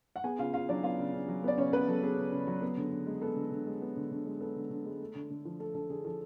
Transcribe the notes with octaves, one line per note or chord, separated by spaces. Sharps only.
F#5
B3 G#4 G#5
C#3 F4 F5
C#3 F4 F5
F#3 D4 D5
B3 F4 F5
C#3
C#3
F#3
B3 D5
C#3 C#4 C#5
C#3 B3 B4
F#3 A4
B3 G#4
C#3
C#3
F#3
B3
D3
D3
G#3
B3 A4
D3
D3
G#3
B3
D3
D3
G#3
B3 A4
D3
D3
G#3
A3
D3
D3
F3
A3 A4
D3 A4
D3 G#4
F3 A4